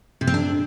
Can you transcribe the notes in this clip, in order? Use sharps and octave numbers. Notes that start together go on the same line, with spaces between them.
C3
C4
D4